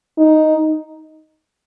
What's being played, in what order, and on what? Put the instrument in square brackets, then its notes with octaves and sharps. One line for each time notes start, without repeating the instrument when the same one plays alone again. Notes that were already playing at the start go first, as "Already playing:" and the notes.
[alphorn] D#4